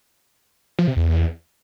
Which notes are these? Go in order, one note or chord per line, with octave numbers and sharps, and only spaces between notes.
F3
C3
E2